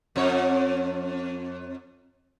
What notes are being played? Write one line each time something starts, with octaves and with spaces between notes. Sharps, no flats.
F2 C#5